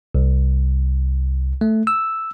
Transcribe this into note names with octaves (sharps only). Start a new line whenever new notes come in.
C2
A3
E6